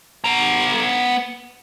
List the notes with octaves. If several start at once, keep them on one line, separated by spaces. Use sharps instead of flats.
B3 A#5